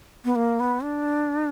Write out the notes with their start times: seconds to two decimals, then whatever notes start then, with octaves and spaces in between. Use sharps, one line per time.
0.25 B3
0.36 A#3
0.60 B3
0.83 D4